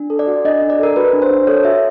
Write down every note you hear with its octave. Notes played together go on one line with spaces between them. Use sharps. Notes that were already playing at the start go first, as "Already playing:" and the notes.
Already playing: D4
A4
D5
F#4
D4 D#5
D4
D5
A4 A#4
F#4 B4
D4
C5
D4
A4 C#5
F#4 E5